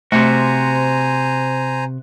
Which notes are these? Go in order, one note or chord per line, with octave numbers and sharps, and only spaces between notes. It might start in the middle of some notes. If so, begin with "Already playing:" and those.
C3 A3 F#4 C5 G#5 A#5